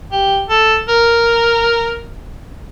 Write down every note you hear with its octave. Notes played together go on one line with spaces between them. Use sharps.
G4
A4
A#4